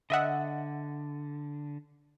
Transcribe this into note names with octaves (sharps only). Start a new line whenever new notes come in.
D3 D#5 E5 F#5